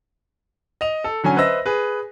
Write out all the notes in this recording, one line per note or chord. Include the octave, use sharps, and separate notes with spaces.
D#5 F7
A4
D3 F#3 C#4 G#5
B4 C5 D#5 E5 E6 A#6
G#4 B4